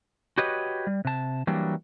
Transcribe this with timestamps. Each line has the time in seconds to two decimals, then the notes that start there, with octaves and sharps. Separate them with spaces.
0.38 F#4 G4 B4 C#5 D#5
0.87 G3
1.05 C3 A5
1.47 E3 F#3 G3 A#3 D4